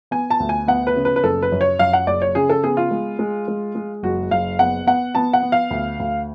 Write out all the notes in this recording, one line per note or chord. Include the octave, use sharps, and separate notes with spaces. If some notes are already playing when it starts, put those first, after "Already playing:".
B3 G#5
A5
D2
G#5
B3 F#5
B4
C#3
B4
B4
F#1 A4
B4
F#2
C#5
F#2 F5
F#5
F#1 D5
C#5
C#3 G#4
A4
B3 G#4
F4
G#3
G#3
G#3
G#3
F#1 F#4
F#1 F5
B3 F#5
B3 F#5
B3 A5
F#5
B3
F5
D2
D2